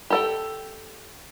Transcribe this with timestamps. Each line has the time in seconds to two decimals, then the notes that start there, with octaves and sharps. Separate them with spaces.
0.10 G4 A4 G5